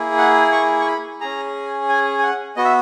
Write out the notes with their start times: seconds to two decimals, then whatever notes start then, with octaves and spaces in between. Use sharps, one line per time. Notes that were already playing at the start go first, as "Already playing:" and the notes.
Already playing: A#3 E4 G#4
0.18 F#5
0.52 C#6
0.81 C#6
0.87 B5
1.21 C#4 G#4 A#5
1.89 G#5
2.19 G#5
2.23 F#5
2.56 B3 F#4 D#5
2.65 E5